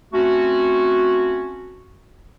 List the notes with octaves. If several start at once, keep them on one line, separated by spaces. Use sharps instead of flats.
A3 C4 C#4 F#4